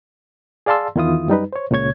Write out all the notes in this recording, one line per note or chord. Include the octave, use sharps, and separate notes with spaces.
G#4 D5 F5 A5 C6 E6
E2 D#3 E4 F4 D#6
F#2 G3 D#4 B4
C5 C#5
C#2 A#2 C#3 C#5 G#6